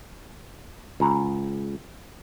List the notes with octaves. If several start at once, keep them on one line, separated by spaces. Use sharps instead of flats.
C#2 A#5